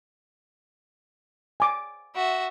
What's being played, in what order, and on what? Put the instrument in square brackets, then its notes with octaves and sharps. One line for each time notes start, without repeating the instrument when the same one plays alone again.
[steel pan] G#5 D6
[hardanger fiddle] F#4 E5